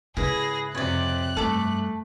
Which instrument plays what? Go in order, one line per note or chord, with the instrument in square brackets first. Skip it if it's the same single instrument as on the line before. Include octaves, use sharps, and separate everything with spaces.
[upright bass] G#2 C#3 [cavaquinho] E4 B4 [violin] G#4 A#6
[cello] F2 C3 [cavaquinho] C#5 D5 [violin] F#6
[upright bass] G2 [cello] A3 [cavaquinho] A4 D6